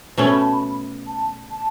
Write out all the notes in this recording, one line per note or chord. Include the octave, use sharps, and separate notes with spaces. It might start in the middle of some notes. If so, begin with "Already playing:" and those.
B2 A3 C#4
B5
A5
B5
A5
A5